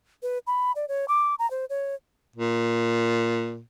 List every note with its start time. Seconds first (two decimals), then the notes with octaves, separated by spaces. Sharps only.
0.23 B4
0.47 B5
0.76 D5
0.89 C#5
1.08 D6
1.39 A#5
1.51 C5
1.70 C#5
2.36 A#2